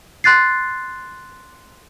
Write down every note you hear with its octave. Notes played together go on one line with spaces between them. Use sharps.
C6 F#6 A6 C7